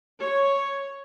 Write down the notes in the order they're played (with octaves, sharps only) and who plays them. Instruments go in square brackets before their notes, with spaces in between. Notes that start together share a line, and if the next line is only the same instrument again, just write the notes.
[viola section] C#5